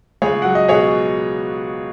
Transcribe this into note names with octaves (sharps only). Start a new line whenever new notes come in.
C#2 G#4 C#5
F#3 F#5
D#5
B2 G#4 C#5